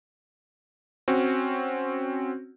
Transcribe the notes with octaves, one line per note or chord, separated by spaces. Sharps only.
C4 C#4 F#4